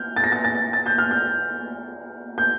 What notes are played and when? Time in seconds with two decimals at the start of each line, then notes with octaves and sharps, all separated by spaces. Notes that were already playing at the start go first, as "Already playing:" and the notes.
Already playing: F6 G6
0.16 A6
0.24 A#6
0.32 A6
0.44 A6
0.73 A6
0.86 G6
0.98 F6
1.11 G6
2.38 G6